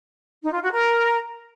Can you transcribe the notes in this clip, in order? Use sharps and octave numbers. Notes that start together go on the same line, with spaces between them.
D#4
F4
F#4
A#4